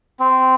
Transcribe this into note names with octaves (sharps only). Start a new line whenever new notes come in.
C4